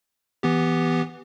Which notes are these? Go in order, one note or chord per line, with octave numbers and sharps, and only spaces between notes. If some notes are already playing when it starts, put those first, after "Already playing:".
E3 B3 G4